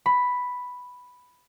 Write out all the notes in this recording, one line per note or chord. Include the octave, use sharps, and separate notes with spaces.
B5